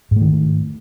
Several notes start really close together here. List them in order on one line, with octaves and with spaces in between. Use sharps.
G#2 A3 D#3